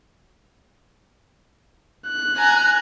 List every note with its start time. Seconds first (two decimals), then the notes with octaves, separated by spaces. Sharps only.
2.07 F#6
2.36 G#5 A#5